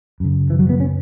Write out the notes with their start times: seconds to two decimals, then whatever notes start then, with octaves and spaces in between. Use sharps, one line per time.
0.20 F#2 C#3
0.50 E3
0.59 F#3
0.70 B3
0.80 C#4